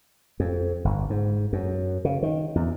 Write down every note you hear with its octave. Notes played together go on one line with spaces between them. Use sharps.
F2
G1
G#2
F#2
C#3
D#3
E2